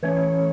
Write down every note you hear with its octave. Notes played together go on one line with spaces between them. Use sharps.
E3 A3 C#4 C#5